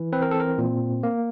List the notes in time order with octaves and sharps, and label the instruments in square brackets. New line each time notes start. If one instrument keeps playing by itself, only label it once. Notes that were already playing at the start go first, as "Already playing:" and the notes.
Already playing: [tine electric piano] E3
C4 B4
A#4
A4
A#4
A#2
A#3